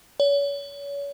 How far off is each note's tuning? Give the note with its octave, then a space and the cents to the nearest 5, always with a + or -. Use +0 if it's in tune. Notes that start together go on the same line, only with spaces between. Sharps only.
C#5 +35